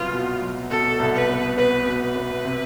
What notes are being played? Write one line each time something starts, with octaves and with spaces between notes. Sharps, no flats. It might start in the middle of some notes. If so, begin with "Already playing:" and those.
Already playing: C2 B2 F#3 B3 F4
B2
F#3
B2 A4
C2
B4
B3
B3 B4
B2
B4
B3
C3